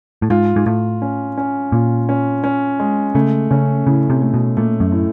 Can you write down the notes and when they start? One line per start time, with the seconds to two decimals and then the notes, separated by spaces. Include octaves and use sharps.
0.22 A2
0.30 G#2 F4
0.56 G#2
0.66 A2 F4
1.02 C#4
1.37 C#4
1.72 A#2 F4
2.09 C#4
2.44 C#4
2.79 G#3
3.15 C#3 A3
3.51 C#3 C#4
3.87 A2 C#3
4.10 C3
4.22 A3
4.34 B2
4.57 A#2 A3
4.80 F#2
4.92 A2